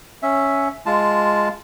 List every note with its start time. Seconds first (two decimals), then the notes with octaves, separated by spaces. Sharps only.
0.23 C#4 E5
0.86 G#3 F4 A5